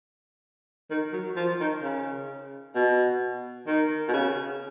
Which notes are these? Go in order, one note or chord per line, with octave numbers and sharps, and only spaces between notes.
D#3
F#3
F3
D#3
C#3
B2
D#3
B2
C#3